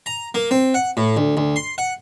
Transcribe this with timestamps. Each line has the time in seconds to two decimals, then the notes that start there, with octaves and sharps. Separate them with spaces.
0.06 A#5
0.34 A#3
0.51 C4
0.74 F#5
0.97 A2
1.17 D2
1.37 D2
1.56 C6
1.78 F#5